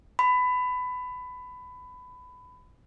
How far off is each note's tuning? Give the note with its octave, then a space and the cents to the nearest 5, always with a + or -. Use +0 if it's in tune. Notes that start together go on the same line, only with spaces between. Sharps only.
B5 +20